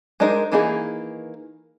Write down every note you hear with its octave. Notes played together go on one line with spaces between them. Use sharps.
G#3 D4 D#4 A#4 C5
D#3 E3 A#3 D#4 G#4